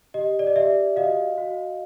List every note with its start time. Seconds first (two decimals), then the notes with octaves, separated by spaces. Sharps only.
0.14 G4 D#5
0.39 D5
0.47 D#5
0.56 G4 D5 E5
0.96 F#4 D#5 F5
1.38 F#4